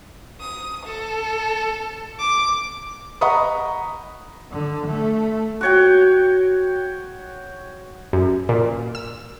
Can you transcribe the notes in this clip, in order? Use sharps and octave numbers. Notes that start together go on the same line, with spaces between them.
D#6
A4
D6
D#5 F#5 A#5 B5 C#6 D#6
D3
A3
F#4 C#5 G5
F#2
A#2
E6